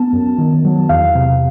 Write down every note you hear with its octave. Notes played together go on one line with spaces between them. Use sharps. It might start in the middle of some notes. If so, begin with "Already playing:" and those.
Already playing: B3 A5
F#2
D#3
F#3
E2 F5
C3